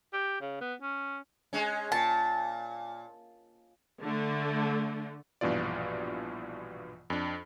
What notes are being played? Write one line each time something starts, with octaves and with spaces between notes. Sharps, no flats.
G4
C#3
B3
C#4
G#3 C#4
A#2 A5
D3 A3
A#1 G2 B2 E3 F4 D5
F2 D4